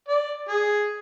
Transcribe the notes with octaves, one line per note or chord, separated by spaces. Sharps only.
D5
G#4